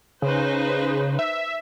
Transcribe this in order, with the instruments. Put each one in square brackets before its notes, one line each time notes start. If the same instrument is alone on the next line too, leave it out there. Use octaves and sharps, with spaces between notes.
[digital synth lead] C#3 [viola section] D#4 B4 C5
[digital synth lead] E5